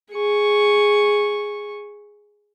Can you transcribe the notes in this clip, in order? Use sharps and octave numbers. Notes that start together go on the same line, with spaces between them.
G#4 C#6